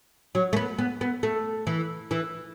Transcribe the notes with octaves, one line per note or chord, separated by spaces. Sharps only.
F#3
A3
B3
B3
B3
A3
E3
E3